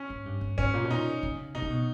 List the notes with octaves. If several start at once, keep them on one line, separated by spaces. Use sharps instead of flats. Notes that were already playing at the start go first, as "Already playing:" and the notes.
Already playing: C#4
G#2
G2
G2
G#2 C#4
A#2
B2
A#2 D#4
C#3
B2 D#4
C#3
B2